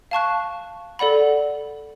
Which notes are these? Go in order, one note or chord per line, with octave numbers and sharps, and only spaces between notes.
F5 A5 C#6 F#6
A4 D5 F#5 B5